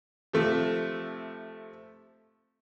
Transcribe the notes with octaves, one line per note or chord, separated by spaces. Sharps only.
C3 F3 A3